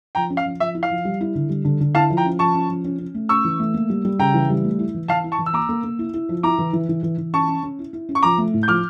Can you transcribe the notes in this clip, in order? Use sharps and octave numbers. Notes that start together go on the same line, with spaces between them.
F3 G5 A#5
C#4
F5
F3
F3 E5
E4
F5
F3
G3
E4
D3
G3
D3
D3
E4 F5 A5
F3
G5 A#5
C#4
F3 A5 C#6
C#4
F3
C#4
C#4
A3
C#4 C#6 E6
E3
A3
A#3
G3
G3
C#3 G5 A#5
E3
G3
A3
E4
E3
E3 F5 A5
E4
A5 C#6
E3
E6
A#3 A#5 D6
A#3
A#3
E4
E4
F3
E4 A#5 D6
E3
E3
E3
E3
E3
C#4 A5 C#6
C#4
C#4
E4
E4
C#4
C#6
F3 A#5 D6
A3
A2
G6
F3 D6 F6